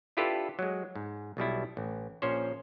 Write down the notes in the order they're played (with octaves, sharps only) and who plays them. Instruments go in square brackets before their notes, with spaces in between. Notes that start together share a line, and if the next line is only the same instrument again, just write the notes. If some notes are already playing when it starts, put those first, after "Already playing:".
[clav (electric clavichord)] D4 E4 F4 G4 A4 B4
F#3 G#3
G#2
B1 B2 G3 E4
A1
A#1 F3 C#4 C5 C#5